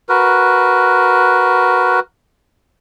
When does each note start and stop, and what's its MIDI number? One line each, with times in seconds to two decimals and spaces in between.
0.09 2.00 66
0.09 2.00 70
0.09 2.00 71